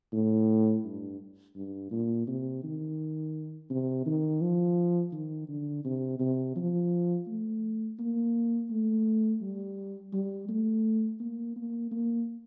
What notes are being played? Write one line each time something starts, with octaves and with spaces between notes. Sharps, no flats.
A2
G2
G2
A#2
C3
D#3
C3
D#3
F3
D#3
D3
C3
C3
F3
A3
A#3
A3
G3
G3
A3
A#3
A#3
A#3